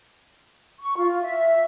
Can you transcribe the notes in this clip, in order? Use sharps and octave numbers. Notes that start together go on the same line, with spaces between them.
C#6
F4
E5